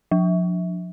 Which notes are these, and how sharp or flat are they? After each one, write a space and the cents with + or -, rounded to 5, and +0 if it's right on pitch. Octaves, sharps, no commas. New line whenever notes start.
F3 +35